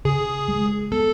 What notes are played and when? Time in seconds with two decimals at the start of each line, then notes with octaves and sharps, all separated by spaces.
0.05 C#3 G#4
0.48 G#3
0.92 B3 A4